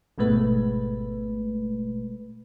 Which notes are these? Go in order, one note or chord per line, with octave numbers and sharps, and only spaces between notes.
G#1 B2 G#3 A3 B4